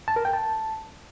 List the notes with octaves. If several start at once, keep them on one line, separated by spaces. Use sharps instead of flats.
A5
A#4
G5
A5